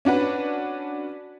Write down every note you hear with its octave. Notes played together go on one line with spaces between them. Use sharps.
C#4 D4 F#4 B4